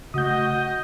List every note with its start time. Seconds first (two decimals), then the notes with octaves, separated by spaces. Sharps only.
0.14 C#3 A3 F#4 D#5 D#6 G6